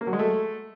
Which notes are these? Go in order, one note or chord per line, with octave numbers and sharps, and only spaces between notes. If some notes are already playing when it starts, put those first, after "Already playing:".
A#3
F#3
G#3
A3